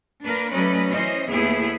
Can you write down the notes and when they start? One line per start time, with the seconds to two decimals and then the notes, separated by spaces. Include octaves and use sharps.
0.24 A#3 D4 A#4 B4
0.53 F#3 A3 C#4 B4 D5 D#5
0.93 E3 C#4 C5 D#5
1.31 D#2 A3 B3 E4 G#4